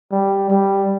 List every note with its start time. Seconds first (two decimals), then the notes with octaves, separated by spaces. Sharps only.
0.12 G3
0.50 G3